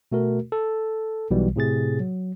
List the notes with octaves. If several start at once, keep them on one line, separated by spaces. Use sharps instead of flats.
B2 A3 F#4 A#4
A4
B1 B2 E3 G3
A2 C3 G#4 A6
F#3